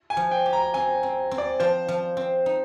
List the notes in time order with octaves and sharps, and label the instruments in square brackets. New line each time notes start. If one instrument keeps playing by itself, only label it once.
[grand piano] G#5
[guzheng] F3
[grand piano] G5
[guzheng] G4
[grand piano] A#5
[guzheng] C4 [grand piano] G#5
[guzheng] C4
C4
[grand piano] D5
[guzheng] F3 [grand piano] C5
[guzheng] F3
C4
D#4